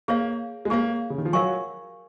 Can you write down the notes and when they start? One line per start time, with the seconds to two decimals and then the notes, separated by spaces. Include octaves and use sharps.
0.08 A#3 G#4 C#5 F5
0.65 G#3
0.70 A#3 G#4 C#5 F5
1.10 C#3
1.18 D#3
1.25 F3
1.33 F#3 A#4 F5 G#5 C#6